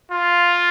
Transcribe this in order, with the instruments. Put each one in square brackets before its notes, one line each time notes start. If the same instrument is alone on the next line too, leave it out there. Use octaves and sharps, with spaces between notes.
[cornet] F4